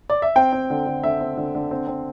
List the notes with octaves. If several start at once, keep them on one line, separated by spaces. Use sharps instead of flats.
D5
E5
C4 G5
C4
D3
D3
D3 E5
C4
D3
D3
C4
C4